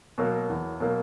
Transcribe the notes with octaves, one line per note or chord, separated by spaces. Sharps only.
B2 F#3 A#3
E2
B2 F#3 A#3